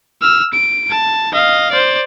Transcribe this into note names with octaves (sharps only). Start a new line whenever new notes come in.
E6 F6
D7
A5
D#5 F5
C5 D5